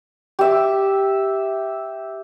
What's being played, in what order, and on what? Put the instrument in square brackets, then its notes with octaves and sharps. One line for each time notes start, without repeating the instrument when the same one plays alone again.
[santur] G4 E5